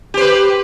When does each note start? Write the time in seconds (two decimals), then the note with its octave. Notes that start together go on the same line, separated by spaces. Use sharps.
0.14 G4
0.17 C5
0.21 B4